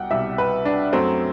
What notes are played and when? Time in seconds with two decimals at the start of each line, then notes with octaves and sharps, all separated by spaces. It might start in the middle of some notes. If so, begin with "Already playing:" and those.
Already playing: C2 B2 G3 F#5 G5
0.11 C2 B2 G3 E5
0.38 B4
0.65 D4
0.93 F#2 F#3 A3 C4